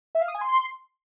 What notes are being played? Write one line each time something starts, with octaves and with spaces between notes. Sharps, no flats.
E5
F5
D#6
G#5
C6